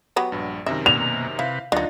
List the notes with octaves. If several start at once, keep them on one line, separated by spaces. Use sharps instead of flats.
F#3 B3 G4
A#1 G2
F#2 C3 D#3 A#4 E5
B2 A#3 D5 F7
C3 E4 B4 F5
D2 F#3 D4 D#4 F4 A#4 A6